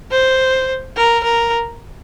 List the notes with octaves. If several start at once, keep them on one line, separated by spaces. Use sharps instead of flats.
C5
A#4
A#4